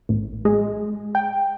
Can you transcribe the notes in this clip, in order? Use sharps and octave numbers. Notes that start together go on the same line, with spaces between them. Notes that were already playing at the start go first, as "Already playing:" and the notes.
A1
G#3
G5